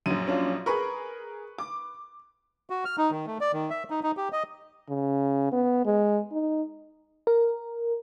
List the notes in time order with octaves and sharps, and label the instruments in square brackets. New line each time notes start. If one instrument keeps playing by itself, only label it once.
[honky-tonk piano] A#1 F#2 [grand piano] D#7
[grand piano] C#4 D4 F4
[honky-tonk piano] G#4 A#4 [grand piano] B4 B5 C#6
[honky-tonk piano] D6
[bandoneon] F#4
F6
D#4
D#3
A3
D5
D#3
E5
D#4
D#4
G4
D#5
[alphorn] C#3
B3
G#3
D#4
[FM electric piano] A#4